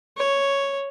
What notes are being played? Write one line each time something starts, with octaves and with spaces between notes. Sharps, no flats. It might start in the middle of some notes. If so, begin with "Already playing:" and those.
C#5